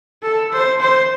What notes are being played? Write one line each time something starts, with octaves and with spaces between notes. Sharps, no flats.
A4
C5
C5